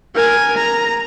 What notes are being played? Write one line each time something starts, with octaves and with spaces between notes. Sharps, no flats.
A#4 G#5
A#5